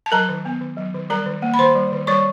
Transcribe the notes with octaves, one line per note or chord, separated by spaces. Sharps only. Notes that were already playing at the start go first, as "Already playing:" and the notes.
A5
F#3 A#4 A#5
D#3
B3
D#3
F#3
D#3
G3 A#4 A#5
D#3
A#3
B5
D#3 C5 C6
G3
D#3
G3 C#5 C#6